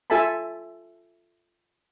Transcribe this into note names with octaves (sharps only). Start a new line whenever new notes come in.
F4 A4 E5 G#5 A5 B5